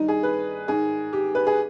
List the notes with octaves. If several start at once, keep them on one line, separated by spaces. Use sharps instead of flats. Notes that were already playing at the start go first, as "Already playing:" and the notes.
Already playing: G2 D#3 D#4
G#4
B4
G#2 D#3 G#4
G4
B4
G#4